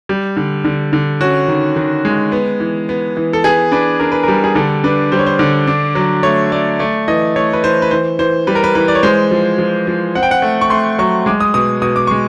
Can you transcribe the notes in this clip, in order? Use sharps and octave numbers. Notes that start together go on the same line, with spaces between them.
G3
D3
D3
D3
C#4 F#4
D#3
D#3
G#3
B3
E3
B3
E3
A4
B3 G#4
D4 B4
D4 A#4
B4
A#4
G3
G#4
D3 A4
D4 B4
G3 C5
C#5
C5
D3
D4
F#3
A3 C#5
A3 D5
A3 D5
E3 D#5
A3 C#5
B4
E3 C5
B4
E3 C5
E3 C5
G3 B4
A#4
B4
E3 B4
D5
C#5
G#3 C5
F3
F3
F3
C4 F#5
G5
F#5
A3
C#6
A3 C6
F#3 C#6
G#3 D6
D#6
B2 D#6
B2 D#6
D6
G#3 C#6